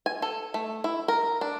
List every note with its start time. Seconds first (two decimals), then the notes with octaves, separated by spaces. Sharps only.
0.06 G#5
0.22 A4
0.54 A3
0.84 E4
1.08 A#4
1.41 D4